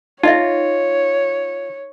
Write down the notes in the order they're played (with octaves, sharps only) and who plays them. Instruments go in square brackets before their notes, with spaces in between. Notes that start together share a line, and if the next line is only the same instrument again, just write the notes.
[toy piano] D#4 D#5 E5 [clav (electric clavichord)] F4 [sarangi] C#5